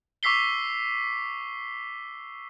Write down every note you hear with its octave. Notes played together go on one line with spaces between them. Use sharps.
C#6 D6 E6 B6 C7 G7